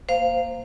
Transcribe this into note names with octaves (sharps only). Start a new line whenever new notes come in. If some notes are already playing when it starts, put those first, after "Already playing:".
A#3 C5 F5